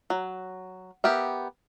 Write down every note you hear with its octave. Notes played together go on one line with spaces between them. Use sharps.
F#3
B3 G4 A#4 E5